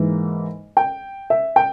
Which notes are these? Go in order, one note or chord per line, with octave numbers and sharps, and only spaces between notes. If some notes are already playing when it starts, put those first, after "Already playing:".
Already playing: G#2 E3 A#3 D#4
G5
E5
G5